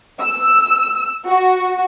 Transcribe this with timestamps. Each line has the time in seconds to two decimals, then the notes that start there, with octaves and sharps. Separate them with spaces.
0.22 E6
1.26 F#4